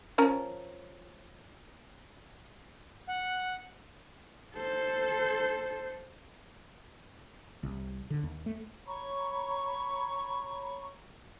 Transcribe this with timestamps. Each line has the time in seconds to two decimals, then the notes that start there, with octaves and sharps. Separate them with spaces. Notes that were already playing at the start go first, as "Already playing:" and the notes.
0.18 F3 C#4 A#4
3.07 F#5
4.55 A4 C5
7.63 C2
8.10 D3
8.23 D#2
8.46 A3
8.86 C#5 A#5 B5 C#6